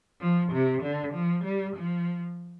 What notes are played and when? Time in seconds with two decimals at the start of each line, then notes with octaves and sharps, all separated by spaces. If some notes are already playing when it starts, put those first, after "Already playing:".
0.21 F3
0.52 C3
0.82 D3
1.13 F3
1.44 G3
1.76 F3